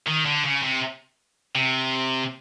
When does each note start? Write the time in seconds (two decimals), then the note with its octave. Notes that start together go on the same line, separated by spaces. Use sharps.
0.07 D#3
0.25 D3
0.44 C#3
0.63 C3
1.55 C3